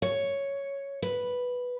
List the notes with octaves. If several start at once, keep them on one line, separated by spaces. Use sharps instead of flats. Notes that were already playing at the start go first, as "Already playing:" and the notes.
C#5
B4